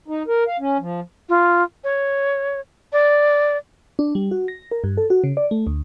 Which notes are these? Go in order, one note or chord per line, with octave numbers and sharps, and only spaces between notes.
D#4
A#4
F5
C#4
F3
F4
C#5
D5
D4
G3
F#4
A#6
A#4
G2
A4
F#4
C#3
D5
A3
D2